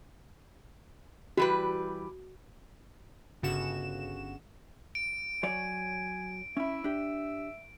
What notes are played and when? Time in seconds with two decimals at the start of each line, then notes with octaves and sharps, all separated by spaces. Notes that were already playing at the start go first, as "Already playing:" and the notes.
1.37 E3 G3 F#4 B4
3.42 G1 C#3 F#4 E7
4.95 D7
5.43 F#3 C#5 D5 G#5
6.57 C#4 E4 E5
6.84 D4 G4